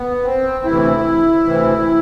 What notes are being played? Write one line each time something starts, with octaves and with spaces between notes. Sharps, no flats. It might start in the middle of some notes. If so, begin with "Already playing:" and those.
Already playing: B3
C4
D2 C3 E3 E4
D2 C3 E3